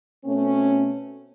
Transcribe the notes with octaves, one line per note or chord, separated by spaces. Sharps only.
B2 A3 C4 C#4